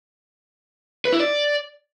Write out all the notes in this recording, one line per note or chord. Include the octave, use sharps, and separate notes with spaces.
B4
E4
D5